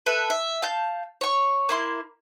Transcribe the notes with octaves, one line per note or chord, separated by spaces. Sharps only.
A4 B4 E5
E5
F5 A5 G6
C#5 C#6
A#3 E4 C6